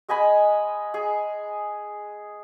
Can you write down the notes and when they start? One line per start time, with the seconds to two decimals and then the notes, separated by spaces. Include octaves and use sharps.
0.09 G#3 D#5 G#5 B5
0.94 G#4